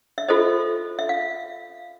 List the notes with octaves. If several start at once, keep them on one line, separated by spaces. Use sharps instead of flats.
E5
F4 A4 C5 D#5
E5
F5